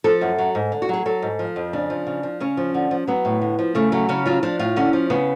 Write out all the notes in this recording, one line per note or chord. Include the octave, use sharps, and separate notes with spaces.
F3 A4
F#2
F#3
G#2
D3
F#4
F#3 G#4
F#3 A4
G#2
F3
F2
C#3 D4
F3
C#3
F3
C#3 C#4
F3
D3
F3
F#3 B3
A2
D3
F3
C#3 A3
F#3 A3
C#3 C#4
F#3 F4
F3 D4
A2 F4
D3 C#4
F3
C#3 B3